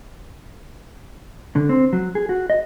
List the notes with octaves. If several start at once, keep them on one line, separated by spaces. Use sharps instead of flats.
D3
C4
F#3
G#4
F#4
D#5